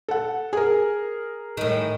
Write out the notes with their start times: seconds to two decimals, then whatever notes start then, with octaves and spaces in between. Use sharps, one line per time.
0.08 A4 F#5
0.53 G#4 A#4
1.57 A2 D#3